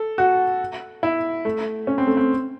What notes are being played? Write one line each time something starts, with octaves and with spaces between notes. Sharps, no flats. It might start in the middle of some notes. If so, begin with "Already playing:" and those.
Already playing: A4
F#4
E4
A3
C#4
C4
A3
C4